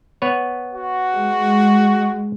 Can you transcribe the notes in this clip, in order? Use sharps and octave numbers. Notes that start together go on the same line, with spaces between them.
B3 B4 C#5
F#4
G#3